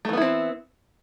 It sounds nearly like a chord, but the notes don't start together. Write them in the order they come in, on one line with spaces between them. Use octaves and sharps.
A3 E3 B3 E4 C4